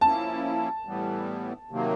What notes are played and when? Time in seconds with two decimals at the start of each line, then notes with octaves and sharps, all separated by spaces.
0.01 F3 A#3 C#4 E4 A5
0.85 A2 E3 G3 B3
1.70 C3 D#3 F#3 A#3